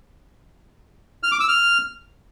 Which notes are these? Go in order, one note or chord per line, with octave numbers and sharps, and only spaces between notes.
F6
D6
E6
F6